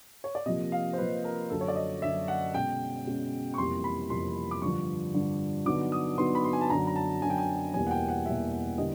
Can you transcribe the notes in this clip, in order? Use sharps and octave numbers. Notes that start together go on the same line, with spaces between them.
C#5
D5
C3 F3 A#3 D#5
F5
C5
C3 F3 A#3 B4
A#4
F#2 D3 F#3 A4
C#5
D5
D#5
F#2 D3 F#3 E5
F#5
B2 G#3 C#4 G5
B2 G#3 C#4
C#6
F2 C3 E3 G3 A#3 C6
B5
F2 C3 E3 G3 A#3 C6
D6
G2 D3 F3 C#6
G2 D3 F3
D3 F#3 B3 D#4 D6
D#6
D3 F#3 B3 D#4 C6
B5
C6
G#5
A5
F#2 D3 F#3 A#5
A#5
A5
F#2 D3 F#3 G#5
G5
G#5
E2 B2 G3 A#3 G#5
F#5
G5
F#5
E2 B2 G3 A#3 E5
D3 G3 B3 E4 D#5